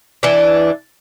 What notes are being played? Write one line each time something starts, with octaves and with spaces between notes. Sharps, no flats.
E3 D4